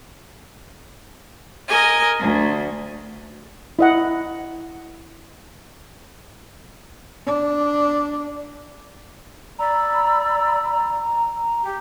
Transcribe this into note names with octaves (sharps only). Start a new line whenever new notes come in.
A#4 D#5 G#5
D2
E4 D#5 F#5
D4
D5 A#5 B5 E6
G4